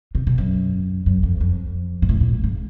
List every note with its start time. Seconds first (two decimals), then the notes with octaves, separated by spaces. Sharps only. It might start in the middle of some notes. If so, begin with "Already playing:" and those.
0.15 C3
0.27 B2
0.38 F#2
1.06 F#2
1.23 F2
1.41 F2
2.02 G#2
2.09 A2
2.21 A#2
2.44 G#2